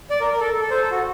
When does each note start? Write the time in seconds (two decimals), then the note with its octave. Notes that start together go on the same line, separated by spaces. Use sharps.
0.10 D5
0.21 A#4
0.31 A#4
0.40 A4
0.61 A4
0.71 C5
0.81 A4
0.91 F#4